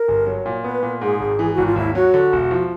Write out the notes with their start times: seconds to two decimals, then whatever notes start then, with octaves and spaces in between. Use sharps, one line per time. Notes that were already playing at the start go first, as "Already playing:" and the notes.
Already playing: A#4
0.08 G1
0.27 F#3
0.46 A#2
0.64 B3 B4
0.83 A#2
1.01 G#2 G#4
1.20 G#1
1.39 E3
1.54 G#1 F#4
1.65 F4
1.76 D#2 E4
1.94 F#3 F#4
2.14 D3
2.33 E1
2.51 F3